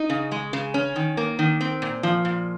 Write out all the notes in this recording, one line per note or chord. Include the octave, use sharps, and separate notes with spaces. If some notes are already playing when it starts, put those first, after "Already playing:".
Already playing: D#4
C#3
G#3
C#3
C#4
D#3
A#3
D#3
C4
A#2
F3
A#2